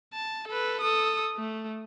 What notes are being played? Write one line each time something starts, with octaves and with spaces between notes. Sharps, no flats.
A5
A4 B4
A4 D#6
A3